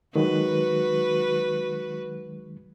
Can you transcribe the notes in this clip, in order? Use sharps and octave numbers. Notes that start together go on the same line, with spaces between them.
D#3 F#3 G#3 F#4 B4